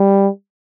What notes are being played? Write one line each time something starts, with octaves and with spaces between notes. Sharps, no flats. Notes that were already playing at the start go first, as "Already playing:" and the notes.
Already playing: G3